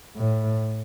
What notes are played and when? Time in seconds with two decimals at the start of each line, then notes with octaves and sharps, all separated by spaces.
0.17 A2